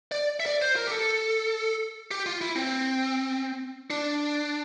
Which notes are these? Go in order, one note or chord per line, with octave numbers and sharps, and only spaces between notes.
D5
E5
D5
C5
A#4
G4
A4
G4
F4
E4
C4
D4